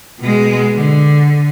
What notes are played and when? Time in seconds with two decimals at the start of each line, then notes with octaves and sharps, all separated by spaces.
0.20 B2 G#3
0.75 D3